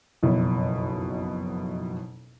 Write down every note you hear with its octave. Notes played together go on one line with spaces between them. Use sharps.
F#1 B1 F2 B2 E4